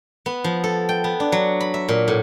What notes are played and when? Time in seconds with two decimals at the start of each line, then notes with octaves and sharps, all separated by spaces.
0.26 B3
0.44 F3
0.64 A4
0.89 G5
1.04 B3
1.20 D4
1.32 F#3
1.60 B5
1.74 E5
1.89 A#2
2.08 A2